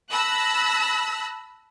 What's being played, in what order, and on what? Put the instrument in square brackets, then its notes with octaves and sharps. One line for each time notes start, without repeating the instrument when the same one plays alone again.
[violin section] A5 B5 E6 F#6 A#6